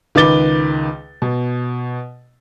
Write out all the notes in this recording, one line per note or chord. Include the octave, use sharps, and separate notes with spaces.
C#2 D#3 B4 D6 A6 G7
B2